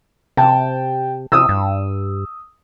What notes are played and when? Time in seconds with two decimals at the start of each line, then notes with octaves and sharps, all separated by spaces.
0.37 C3 G5 A5
1.32 C3 D#6 E6
1.49 G2